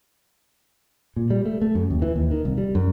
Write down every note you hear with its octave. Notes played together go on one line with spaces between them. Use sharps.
A#2
G3
A3
A3
F#2
D#2
E3
D#2
D#3
C2
G3
F#2